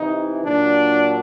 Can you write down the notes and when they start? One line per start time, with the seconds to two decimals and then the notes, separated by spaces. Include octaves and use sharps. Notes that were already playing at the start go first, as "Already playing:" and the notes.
Already playing: C3 E3 D#4
0.44 A#2 F#3 D4